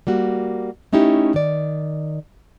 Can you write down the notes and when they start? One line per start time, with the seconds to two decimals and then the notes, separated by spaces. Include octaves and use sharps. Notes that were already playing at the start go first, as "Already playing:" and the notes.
0.07 G3 A#3 F#4
0.93 A3 C#4 D#4 E4 G4
1.34 D#3 D5